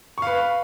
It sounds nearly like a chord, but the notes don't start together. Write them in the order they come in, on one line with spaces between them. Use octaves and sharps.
C#6 F5 B4